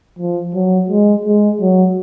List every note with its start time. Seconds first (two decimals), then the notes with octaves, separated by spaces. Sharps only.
0.19 F3
0.55 F#3
0.90 G#3
1.26 G#3
1.61 F#3